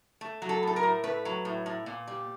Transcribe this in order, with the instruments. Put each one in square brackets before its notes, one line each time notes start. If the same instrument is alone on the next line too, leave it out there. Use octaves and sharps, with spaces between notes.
[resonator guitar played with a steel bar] A3
F#3
A4
A2 A4
A#4
A2
A3 B4
F#3
A2
A2
A#2
G3